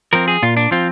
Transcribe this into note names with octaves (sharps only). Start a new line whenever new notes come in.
F3 C4 A#4
G#4
A#2 F4
D4
F3 C4 F4